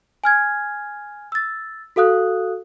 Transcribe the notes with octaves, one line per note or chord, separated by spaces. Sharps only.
G#5 F6 G#6
E6 A6
F#4 A4 F5 D#6 F#6